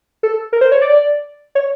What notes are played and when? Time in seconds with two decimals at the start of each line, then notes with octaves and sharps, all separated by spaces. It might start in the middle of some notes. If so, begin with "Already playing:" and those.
0.23 A4
0.53 A#4
0.61 C5
0.72 C#5
0.82 D5
1.55 C#5